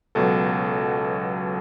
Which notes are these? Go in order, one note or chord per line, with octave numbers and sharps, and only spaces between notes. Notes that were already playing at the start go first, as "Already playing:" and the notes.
C#2 B2 F#3 A4